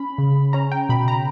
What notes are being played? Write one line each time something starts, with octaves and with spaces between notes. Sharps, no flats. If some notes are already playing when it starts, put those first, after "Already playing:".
Already playing: C#4 B5
C#3
C#4 A#5
G5
B2 B5
A#5